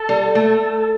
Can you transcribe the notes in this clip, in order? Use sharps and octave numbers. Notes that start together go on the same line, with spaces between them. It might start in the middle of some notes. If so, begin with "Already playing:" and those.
Already playing: A4
G3
A3